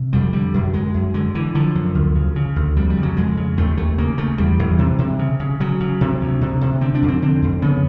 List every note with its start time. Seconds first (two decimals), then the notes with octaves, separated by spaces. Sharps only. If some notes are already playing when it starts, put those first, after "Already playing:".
Already playing: C3
0.13 F2 G3
0.33 D3 G3
0.54 F#2
0.73 F#2 G#3
0.94 F#2
1.14 D3 G#3
1.35 D3 E3
1.55 D3 F3
1.75 F#2
1.95 D2
2.15 C#3
2.36 C#3
2.56 D2
2.76 F2 G3
2.90 G3
2.97 C#3
3.03 F#3
3.17 F2 G#3
3.37 C#3
3.57 D#2 A3
3.77 D#2 A3
3.98 C#3 A#3
4.18 C#3 A3
4.38 E2 G3
4.59 E2
4.79 C3
4.99 C3
5.19 C#3
5.40 C#3
5.60 C#3 F#3
5.80 C#3
6.01 C3
6.21 D2
6.41 C3
6.61 C3
6.81 D3 C4
6.95 D4
7.02 F2
7.08 C4
7.22 D3 C4
7.42 F2
7.62 C#3 B3